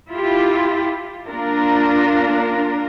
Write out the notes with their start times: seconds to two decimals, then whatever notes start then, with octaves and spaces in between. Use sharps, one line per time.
0.10 E4 F4 G4
1.27 A#3 D4 F4 A#4